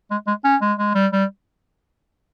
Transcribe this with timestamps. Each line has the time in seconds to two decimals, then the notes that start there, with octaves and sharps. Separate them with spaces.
0.11 G#3
0.27 G#3
0.44 C#4
0.61 G#3
0.79 G#3
0.95 G3
1.13 G3